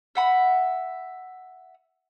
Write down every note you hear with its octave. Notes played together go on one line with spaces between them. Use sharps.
E5 F#5 B5